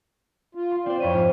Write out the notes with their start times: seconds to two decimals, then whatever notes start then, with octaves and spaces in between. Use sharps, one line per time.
0.55 F4
0.71 C6
0.86 C4 F4 C5 D5
1.00 F2 E4 C#5 D#7
1.14 G#2 F3